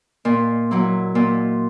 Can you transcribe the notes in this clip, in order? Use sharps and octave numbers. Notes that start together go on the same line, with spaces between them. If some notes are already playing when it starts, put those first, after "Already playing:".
A#2
F#3 A#3 E4
A#2